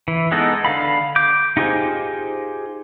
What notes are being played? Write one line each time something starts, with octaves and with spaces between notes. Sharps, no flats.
E3
G#3 B3 D#4 G#4 A4
D3 F5 B5
D6 G6
D#4 F4 G4 G#4 C5